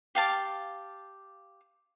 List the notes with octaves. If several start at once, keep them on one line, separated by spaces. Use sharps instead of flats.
G4 F5 A5 D6